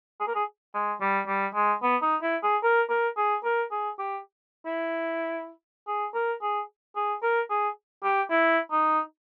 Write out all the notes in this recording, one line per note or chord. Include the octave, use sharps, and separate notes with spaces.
G#4
A#4
G#4
G#3
G3
G3
G#3
B3
D#4
E4
G#4
A#4
A#4
G#4
A#4
G#4
G4
E4
G#4
A#4
G#4
G#4
A#4
G#4
G4
E4
D#4